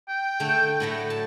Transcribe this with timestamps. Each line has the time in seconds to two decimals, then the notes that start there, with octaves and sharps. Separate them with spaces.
0.08 G5
0.40 D3 A3
0.80 A2 F#3 A3
1.10 A5